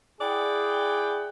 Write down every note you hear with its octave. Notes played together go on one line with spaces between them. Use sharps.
E4 G#4 D5 F#5 G5